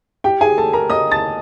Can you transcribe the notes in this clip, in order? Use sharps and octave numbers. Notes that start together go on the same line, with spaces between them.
G4 G5
G#4 G#5
A4 A5
A#4 A#5
D#5 D#6
A5 A6